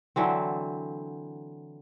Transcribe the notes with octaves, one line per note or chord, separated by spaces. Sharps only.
D3 E3 F#3 C4